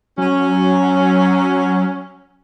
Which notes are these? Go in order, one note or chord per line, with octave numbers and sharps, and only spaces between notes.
F#3 C#4